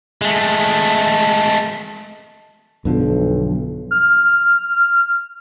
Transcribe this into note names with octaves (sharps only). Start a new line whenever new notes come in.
G#3 A3
B1 G2 D3 F3
F6